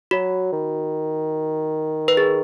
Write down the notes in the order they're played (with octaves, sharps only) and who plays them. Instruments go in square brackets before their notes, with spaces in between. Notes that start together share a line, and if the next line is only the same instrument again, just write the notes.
[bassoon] F#3 [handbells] F#4
[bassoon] D#3
[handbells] B4
G#4